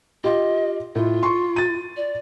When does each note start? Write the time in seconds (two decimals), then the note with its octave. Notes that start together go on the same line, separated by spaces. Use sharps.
0.24 F4 G4 D#5
0.95 A2 F4
1.23 C6 C#6
1.56 A6 D#7
1.96 D5